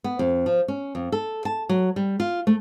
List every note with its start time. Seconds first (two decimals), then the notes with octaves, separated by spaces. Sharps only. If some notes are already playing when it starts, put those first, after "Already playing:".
0.04 B3
0.19 F2
0.46 F3
0.68 C#4
0.95 F2
1.12 A4
1.45 A5
1.69 F#3
1.96 G3
2.20 F4
2.47 A3